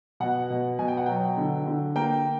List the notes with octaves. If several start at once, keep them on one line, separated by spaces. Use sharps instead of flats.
B2 F#5
B2
B2 G#5
G5
F#5
F#3 G5
D3
D3
A#3 G5